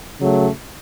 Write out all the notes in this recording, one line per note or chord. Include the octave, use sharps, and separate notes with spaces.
C#3 F#3 A3